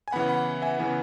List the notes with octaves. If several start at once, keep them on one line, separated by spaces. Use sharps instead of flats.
G#5
C#3 E3 B3 F#5 B5
F#5 B5
E5 G#5
C#3 E3 B3